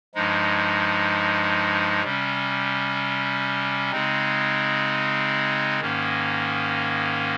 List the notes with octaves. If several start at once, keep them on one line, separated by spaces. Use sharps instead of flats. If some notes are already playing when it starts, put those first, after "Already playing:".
G2 F3 G#3 D#4
C3 G3 C#4
C#3 G#3 C4 D#4
G#2 D#3 A#3 C#4